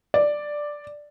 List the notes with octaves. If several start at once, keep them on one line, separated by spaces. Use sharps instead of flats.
D5